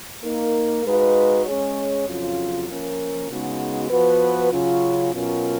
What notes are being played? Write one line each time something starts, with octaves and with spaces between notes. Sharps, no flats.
A#3 D#4 A#4
G#3 D#4 F#4 B4 F5
G#3 C#4 G#4 C#5
F2 C#3 F#3 C#4 F4
F3 A#3 C#4 F4 A#4
C#3 G#3 B3 D#4 F#4
F3 B3 F#4 B4
C#3 F#3 C#4 F4
B2 F#3 C#4 F4 A#4